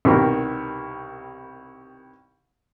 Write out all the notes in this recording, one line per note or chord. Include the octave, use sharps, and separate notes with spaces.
C2 B2 D#3 G3 A#4